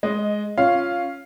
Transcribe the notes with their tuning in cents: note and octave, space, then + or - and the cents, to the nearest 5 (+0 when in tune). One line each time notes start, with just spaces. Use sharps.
G#3 +10 D#5 +0
C#4 +0 F4 +0 F5 +0